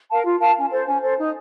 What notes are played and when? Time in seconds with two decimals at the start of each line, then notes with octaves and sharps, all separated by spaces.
0.09 A#4 F5 A5
0.25 F4
0.40 A#4 F5 A5
0.56 C#4
0.71 A4 C5
0.87 C#4
1.02 A4 C5
1.18 D#4